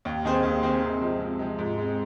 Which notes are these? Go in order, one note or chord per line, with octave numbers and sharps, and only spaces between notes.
D#2
D#3 C4 G#4 C5
D#2
D#3 C4 G#4 C5
C3
F3 G#3
C3
F3 G#3
G#2
G#3 C4